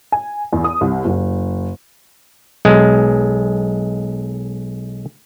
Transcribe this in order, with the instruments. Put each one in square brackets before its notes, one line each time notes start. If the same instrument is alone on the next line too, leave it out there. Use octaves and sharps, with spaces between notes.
[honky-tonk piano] G#5
E2
D#6
C2
F#1
[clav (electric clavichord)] B1 G#3